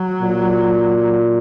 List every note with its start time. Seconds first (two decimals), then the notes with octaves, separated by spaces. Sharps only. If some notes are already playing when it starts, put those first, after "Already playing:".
Already playing: F#3
0.21 A#2